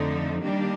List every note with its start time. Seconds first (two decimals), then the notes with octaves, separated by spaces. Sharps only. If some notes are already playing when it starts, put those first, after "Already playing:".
Already playing: F2 D3 F3 A3 D#4
0.42 D#3 G3 A#3 D4 G4